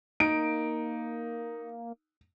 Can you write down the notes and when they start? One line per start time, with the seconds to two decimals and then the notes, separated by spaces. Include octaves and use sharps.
0.20 A#3 D#4 D7